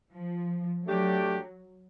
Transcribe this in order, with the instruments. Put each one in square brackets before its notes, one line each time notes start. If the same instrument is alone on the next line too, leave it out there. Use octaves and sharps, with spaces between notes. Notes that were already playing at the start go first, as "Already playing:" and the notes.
[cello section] F3
[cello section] F#3 [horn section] A3 D4 G4